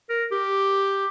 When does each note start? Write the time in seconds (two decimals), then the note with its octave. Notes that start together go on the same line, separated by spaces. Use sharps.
0.09 A#4
0.31 G4